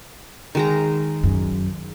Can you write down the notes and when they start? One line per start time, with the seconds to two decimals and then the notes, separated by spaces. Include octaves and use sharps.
0.55 D#3 G#3 A#5
1.24 F#2